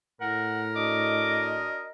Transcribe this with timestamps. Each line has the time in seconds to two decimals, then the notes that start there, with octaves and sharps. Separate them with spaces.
0.21 A2 A#4 F#5
0.76 D4 F#4 D#5 D6